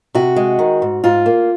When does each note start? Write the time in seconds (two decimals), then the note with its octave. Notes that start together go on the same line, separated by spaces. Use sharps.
0.15 C3 F#4
0.36 G#3
0.59 D#3
0.82 G#2
1.04 G#2 F4
1.26 A#3